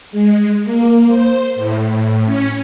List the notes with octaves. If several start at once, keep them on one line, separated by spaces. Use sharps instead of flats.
G#3
A#3
C5
A2
C#4